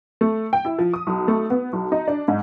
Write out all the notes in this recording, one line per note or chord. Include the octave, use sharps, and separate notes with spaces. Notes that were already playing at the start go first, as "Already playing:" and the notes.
A3
G5
E4
F3
D#6
B1
A3
B3
B1
D#4
D4
G#2